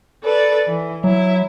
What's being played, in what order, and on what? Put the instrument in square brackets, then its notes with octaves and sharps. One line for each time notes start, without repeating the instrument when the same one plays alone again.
[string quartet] A4 B4 D5
E3
[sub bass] F#3 [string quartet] E4